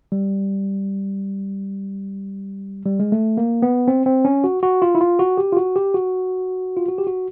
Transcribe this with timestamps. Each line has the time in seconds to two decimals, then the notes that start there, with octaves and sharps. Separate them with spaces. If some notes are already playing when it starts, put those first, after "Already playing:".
0.12 G3
2.86 G3
3.00 G#3
3.12 A3
3.37 A#3
3.62 B3
3.88 C4
4.06 C4
4.25 C#4
4.44 F#4
4.63 F#4
4.82 F4
4.95 E4
5.01 F4
5.19 F#4
5.37 G4
5.53 F4
5.57 F#4
5.76 G4
5.94 F#4
6.77 F4
6.88 F#4
6.98 G4
7.07 F#4